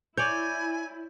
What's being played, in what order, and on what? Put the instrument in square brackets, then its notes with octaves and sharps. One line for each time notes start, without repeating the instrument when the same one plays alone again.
[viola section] E4 [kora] C#5 D5 [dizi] G#5 [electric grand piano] G6